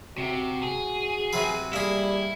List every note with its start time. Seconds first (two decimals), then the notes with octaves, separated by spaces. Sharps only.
0.18 C3 F#4
0.63 G#4
1.33 C3 F#3 B4
1.73 G3 A#3 E4 G#4